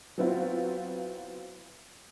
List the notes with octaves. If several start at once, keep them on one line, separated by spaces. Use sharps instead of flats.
F#3 B3 C4 E4 F4